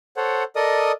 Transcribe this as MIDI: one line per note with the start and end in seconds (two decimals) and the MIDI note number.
0.17 0.44 69
0.17 0.44 72
0.17 0.44 73
0.17 0.44 78
0.56 0.92 69
0.56 0.92 70
0.56 0.92 74
0.56 0.92 75
0.56 0.92 87